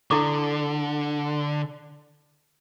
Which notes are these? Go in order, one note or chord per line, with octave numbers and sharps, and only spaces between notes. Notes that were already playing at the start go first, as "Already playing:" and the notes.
D3 E4 A4 D6